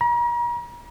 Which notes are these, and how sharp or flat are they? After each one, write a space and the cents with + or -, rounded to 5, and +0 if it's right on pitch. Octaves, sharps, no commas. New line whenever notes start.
A#5 +40